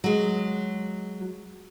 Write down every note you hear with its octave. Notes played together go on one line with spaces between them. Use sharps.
F#3 G#3